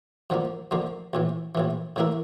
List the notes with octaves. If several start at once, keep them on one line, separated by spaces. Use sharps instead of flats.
F2 D3 F3 A#3
F2 D3 F3 A#3
A#1 A2 E3
A#1 A2 E3
A2 E3 A#3 E4 A#4